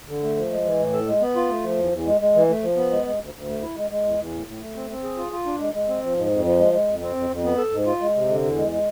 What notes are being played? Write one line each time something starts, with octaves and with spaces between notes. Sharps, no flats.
D3
A3
F3
G#3
E3
A2
A4
G#3
B3
F4
A3
F3
E2
E2
G#3
G#3
E3
A3
F3
B3
G#3
G#3
D2
D2
A3
E4
G#3
G#3
E2
E2
A2
A2
A3
C4
C4
G#4
F4
F4
D4
G#3
G#3
C4
F3
G#2
F2
F3
G#3
G#3
F2
C4
F2
F2
B3
A4
G#2
F4
G#3
C3
D3
E2
G#3
G#3